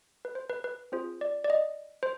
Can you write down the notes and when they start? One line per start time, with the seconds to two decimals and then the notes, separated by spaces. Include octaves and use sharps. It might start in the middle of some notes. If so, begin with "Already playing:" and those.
0.25 B4
0.35 C5
0.49 B4
0.64 B4
0.92 C4 F4 G#4 C5
1.21 D5
1.44 D5
1.50 D#5
2.03 C5